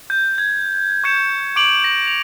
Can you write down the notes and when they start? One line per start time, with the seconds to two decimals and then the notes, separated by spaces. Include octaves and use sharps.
0.10 G6
0.38 G#6
1.04 C#6 G6 C#7 E7
1.56 C#6 D6 D7 F7 F#7
1.84 A#6
2.07 F7